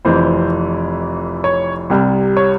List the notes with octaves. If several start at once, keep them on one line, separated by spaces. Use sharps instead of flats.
F1 F2 E3 C5
C#5
C2 C3 G3
C#5